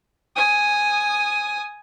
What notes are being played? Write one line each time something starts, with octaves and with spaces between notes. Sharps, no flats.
G#5 D#6